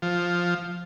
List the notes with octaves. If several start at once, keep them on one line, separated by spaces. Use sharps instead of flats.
F3